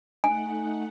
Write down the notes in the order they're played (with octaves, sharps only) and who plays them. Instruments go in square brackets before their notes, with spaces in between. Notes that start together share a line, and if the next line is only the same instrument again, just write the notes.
[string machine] A3 D#4 F#5 [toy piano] G#5